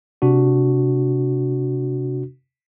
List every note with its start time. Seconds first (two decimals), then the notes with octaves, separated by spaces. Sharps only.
0.22 C3 D4 F#4